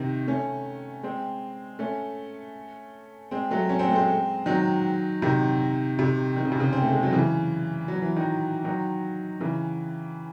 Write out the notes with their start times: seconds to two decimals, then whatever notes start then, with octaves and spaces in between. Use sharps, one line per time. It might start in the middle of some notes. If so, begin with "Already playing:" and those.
Already playing: C3 D#3
0.27 A3 C#4
1.03 G#3 C4
1.79 A3 C#4
3.31 G#3 C4
3.51 F#3 A3
3.69 C#4
3.79 C4
3.88 A3
3.95 G#3 C4
4.46 D#3 F#3
5.22 C3 D#3
5.99 C3
6.36 D#3
6.45 C#3
6.52 C3
6.60 C#3
6.72 C4
6.82 A3
6.92 G#3
7.03 F#3
7.13 C#3 E3
7.88 F#3
8.02 E3
8.16 D#3 F#3
8.64 D#3 F#3
9.41 C#3 E3